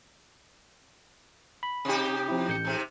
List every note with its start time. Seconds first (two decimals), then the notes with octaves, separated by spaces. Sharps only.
1.63 B5
1.85 C3 D#4 G4
2.28 F3 C4 E4
2.48 A1 G6 C#7
2.65 G#2 C3